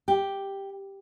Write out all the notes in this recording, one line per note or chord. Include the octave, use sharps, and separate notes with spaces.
G4